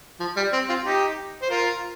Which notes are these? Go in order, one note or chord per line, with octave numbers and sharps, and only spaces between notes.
F3
G3
C4
C4 F4
D#4 G4
C5
F4 A#4